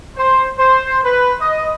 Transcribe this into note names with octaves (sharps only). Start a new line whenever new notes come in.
C5
C5
B4
D#5